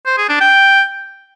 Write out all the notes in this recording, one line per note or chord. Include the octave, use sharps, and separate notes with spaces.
C5
G#4
D4
G5